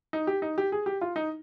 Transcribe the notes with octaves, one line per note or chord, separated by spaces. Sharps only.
D#4
G4
D#4
G4
G#4
G4
F4
D#4